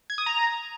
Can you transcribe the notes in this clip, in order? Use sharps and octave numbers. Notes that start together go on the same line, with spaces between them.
G#6
D#6
A#5